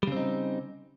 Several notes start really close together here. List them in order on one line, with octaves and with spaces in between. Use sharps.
G3 C#3 C4 D#4